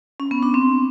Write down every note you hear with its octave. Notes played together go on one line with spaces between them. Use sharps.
C#4
B3
D4
C4